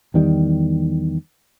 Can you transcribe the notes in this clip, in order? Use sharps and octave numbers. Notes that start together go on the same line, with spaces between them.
E2 D#3 G3